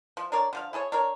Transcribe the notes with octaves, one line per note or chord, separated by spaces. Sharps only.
F3
D4 A#4 C#5 D5
D3 F3 F5
E4 G#4 A4 C#5
D4 A#4 C#5